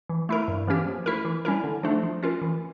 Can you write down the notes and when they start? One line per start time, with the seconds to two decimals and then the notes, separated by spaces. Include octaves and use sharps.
0.09 E3
0.29 A3 E4 A#4
0.48 G2
0.67 E3 A#3 C#4 G4
0.87 F3
1.06 A3 E4 A#4
1.25 E3
1.45 G3 C#4 E4 A#4
1.64 D3
1.83 F3 A3 D4
2.03 F3
2.23 C#4 F4 A#4
2.42 E3